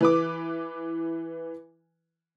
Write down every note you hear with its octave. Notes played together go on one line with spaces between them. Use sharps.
E3 B4 D6